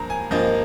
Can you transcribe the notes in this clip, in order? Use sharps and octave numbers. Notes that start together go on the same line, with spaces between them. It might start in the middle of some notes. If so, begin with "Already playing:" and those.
Already playing: G2 F3 A#3 A#5
G#5
G2 F3 A#3 D#5